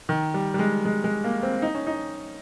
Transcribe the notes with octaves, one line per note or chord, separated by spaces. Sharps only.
D#3
G3
G3
G#3
G#3
G#3
A#3
C4
D#4
C#4
D#4